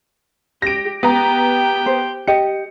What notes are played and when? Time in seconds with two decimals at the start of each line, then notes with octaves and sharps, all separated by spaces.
0.62 G4 A#6 D7
1.03 B3 G4 G5 A#5
1.86 C5
2.27 G4 D#5 C#7